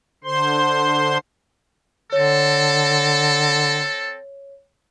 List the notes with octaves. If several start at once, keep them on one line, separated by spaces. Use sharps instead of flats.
D3 C5 C6
D3 C4 A4 C#5